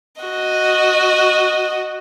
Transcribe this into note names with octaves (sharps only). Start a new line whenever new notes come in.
F#4 D#5